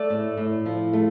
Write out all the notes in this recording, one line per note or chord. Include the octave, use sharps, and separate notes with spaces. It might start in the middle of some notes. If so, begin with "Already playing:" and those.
Already playing: A3 D5
A2
A2
F3
A3